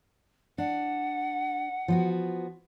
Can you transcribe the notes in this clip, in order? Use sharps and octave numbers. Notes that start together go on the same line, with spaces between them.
D4 F#5
F3 B3 F#4